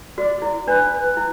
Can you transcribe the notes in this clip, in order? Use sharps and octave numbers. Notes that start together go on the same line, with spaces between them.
F#4 D5
E4
D4 B4
E4